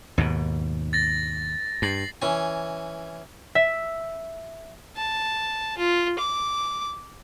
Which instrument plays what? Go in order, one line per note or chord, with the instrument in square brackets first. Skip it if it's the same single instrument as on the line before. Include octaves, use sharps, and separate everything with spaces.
[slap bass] D#2 G#2 B2
[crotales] A6 A#6
[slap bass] G2 [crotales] A#6 C7 F#7
[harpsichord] E3 C#4 G#5
[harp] E5
[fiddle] A5
F4
D6